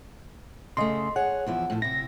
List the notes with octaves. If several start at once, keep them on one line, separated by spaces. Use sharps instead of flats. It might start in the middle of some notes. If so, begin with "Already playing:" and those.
C#3 A3 D#5 C6
G#4 C#5 F#5
E2 F3 E4
A2 F3
C3 E4 A#6